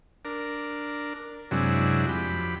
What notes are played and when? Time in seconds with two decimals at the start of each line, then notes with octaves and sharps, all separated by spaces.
0.25 D4 A#4
1.51 F#2 C3 F#3 G#3 D4 E4
2.09 F2 G4 B5